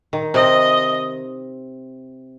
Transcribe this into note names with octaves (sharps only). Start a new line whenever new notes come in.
D#3
C3 D#5